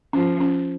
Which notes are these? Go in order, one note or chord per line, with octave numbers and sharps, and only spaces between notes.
F3 C#4
C#4